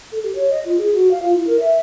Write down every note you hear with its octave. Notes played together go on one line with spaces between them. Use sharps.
A4
G4
C#5
D#5
F4
G#4
F#4
F5
F4
E4
A#4
E5